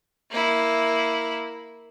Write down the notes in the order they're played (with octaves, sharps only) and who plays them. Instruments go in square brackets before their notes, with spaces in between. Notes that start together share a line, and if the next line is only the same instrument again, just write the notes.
[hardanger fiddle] A#3 E4